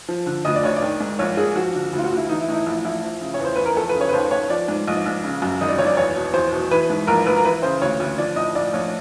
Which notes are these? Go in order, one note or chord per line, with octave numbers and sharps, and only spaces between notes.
F3
D3
D2 D#5
D5
D2 C#5
D5
D#3
G#2
A#1 C#5
A#1 G#4
F3 F#4
D3
D2
F4
F#4
D2
E4
E3 D#4
E4
A2 D#4
E4
A#1 E4
A#1 E4
F3
C#3
C#5
E2
C5
E2 B4
A#4
F3 A4
B4
C#3
C#5
B4
D#2 C5
D#2 C#5
F3 D5
G#2
A#1 D#5
A#1
C#3
F#2
G#1 D#5
D5
G#1 C#5
D5
E2 C#5
B2
E2 C5
B2
E3 B4
G#2
A#1 A#4
A#1 B4
A#4
E3 B4
C#3 C5
D2 C#5
D2
F3 D5
A2 D#5
A#1 D5
A#1 C#5